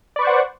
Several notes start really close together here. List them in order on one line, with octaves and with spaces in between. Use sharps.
D5 B4 C#6 C5 F#5